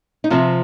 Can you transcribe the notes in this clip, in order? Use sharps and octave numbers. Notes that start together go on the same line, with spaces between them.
D#4
C3 F3 C4 F4